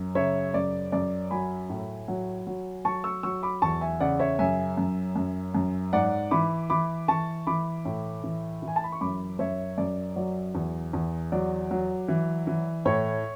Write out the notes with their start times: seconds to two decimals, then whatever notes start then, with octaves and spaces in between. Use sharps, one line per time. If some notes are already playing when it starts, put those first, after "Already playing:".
Already playing: F#2
0.15 C#3 C#5 E5
0.54 F#2 D5
0.92 F#2 D5
1.31 F#3 G#5 B5
1.70 A2
2.08 F#3
2.47 F#3
2.85 F#3 A5 C#6
3.04 C#6 E6
3.23 F#3 C#6 E6
3.43 B5 D6
3.62 E2 A5 C#6
3.81 E5 G#5
4.00 C#3 D5 F#5
4.19 C#5 E5
4.39 F#2 E5 G#5
4.78 F#2
5.16 F#2
5.55 F#2
5.93 G#2 D5 F#5
6.31 E3 B5 D6
6.70 E3 B5 D6
7.08 E3 A5 C#6
7.47 E3 B5 D6
7.85 A2
8.24 E3
8.62 E3
8.68 G#5
8.76 A5
8.84 B5
8.92 C#6
9.01 F#2 B5 D6
9.39 F#2 C#5 E5
9.78 F#2 D5
10.16 F#3 D5
10.55 E2
10.93 E2
11.32 F#3 D5
11.71 F#3
12.08 E3
12.47 E3
12.85 A2 C#5